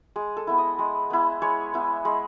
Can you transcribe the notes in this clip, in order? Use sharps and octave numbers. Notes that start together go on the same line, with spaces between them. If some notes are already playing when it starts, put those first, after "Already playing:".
G#3 G#4
A4
B3 E4
D#5
G#3
B3 E4
G#3 C#5
B3 E4
G#3